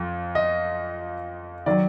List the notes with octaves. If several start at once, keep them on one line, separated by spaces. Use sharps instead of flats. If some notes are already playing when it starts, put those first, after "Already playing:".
Already playing: F2 F3
D#5
D#3 F#3 D5